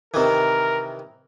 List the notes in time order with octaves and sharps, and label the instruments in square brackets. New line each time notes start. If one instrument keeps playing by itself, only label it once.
[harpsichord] C3 D#3 E3 [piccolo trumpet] A#4